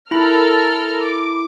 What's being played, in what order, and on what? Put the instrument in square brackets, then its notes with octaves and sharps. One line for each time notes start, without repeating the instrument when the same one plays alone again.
[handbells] E4 B5 [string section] A4 A#4 F6
[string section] D6